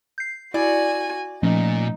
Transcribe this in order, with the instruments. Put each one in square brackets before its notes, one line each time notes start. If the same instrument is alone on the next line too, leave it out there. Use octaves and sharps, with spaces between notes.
[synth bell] G6 C7
[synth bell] E4 [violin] F#4 G#5 [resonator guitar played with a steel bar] D5
[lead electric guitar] A#2 [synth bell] F3 A3 C#4 [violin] D#4